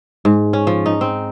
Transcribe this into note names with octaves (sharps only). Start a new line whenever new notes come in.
G#2
C#4
F3
D#4
C4